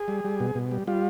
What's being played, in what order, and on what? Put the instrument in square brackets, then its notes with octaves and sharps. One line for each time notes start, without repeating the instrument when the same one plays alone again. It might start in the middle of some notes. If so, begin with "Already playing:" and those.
Already playing: [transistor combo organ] G#4
G3
G3
B2
B2
G3
G3 F4